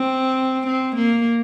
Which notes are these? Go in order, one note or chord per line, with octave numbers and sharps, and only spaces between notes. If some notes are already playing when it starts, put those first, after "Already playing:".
Already playing: C4
C4
A#3